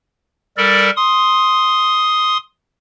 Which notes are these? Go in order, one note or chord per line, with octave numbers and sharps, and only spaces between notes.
G3 A4 A#4 D5
C6 D#6